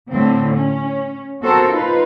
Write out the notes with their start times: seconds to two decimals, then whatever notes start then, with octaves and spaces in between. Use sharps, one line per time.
0.12 A2 D3 C4
0.55 C#4
1.41 B3 C4 F#4 A4 A#4 C5
1.70 D#4 F4 B4 C5